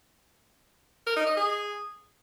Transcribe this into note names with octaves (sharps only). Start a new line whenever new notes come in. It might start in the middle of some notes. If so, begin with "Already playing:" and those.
A#4
D#4
D#5
G#4